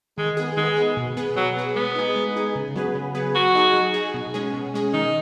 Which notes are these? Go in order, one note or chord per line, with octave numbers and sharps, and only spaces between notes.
D#3 G#3
B3 G#4
D#3 G#3
B3 G#4
B2
B3 G#4 B4
B2 F#3
B3 G#4 B4
G#3 B3
D#4 G#4
G#3
D#4 G#4
C#3
F#3 B3 G#4 B4
C#3
F#3 B3 G#4 B4
F#3 F#4
D#4 G#4
F#3
D#4 G#4
B2
G#3 C#4 G#4
B2
G#3 C#4 G#4
D#3 D#4